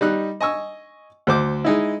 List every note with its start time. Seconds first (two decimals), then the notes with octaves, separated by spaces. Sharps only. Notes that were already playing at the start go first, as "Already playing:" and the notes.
0.01 G3 D#4 F#6
0.41 D#5 G#5 C#6 E6
1.27 D2 C5 D6
1.64 G#3 D#4 E4